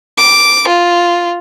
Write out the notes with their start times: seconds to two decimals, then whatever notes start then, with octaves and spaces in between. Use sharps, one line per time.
0.17 D6
0.68 F4